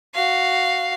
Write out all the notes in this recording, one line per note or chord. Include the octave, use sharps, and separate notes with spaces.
F#4 F5